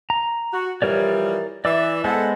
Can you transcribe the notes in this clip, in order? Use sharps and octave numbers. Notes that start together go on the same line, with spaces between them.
A#5
F#4
E3 F3 G3 A#4 C#5 D5
E3 D5 E5 D6 E6
G#3 B3 A4 C5 F#5